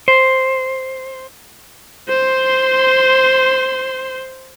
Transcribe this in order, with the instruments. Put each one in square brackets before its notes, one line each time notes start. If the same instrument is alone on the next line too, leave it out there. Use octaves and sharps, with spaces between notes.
[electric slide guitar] C5
[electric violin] C5 C6